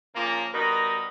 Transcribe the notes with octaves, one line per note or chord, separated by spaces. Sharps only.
A#2 C#3 F3 A#3
B2 G3 D#4 A#4 B5